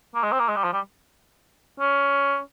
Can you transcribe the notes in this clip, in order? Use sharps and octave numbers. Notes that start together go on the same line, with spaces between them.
A#3
G#3
C4
A#3
G#3
G3
F3
G3
C#4